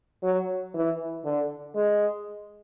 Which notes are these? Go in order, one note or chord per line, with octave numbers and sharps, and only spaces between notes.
F#3
E3
D3
G#3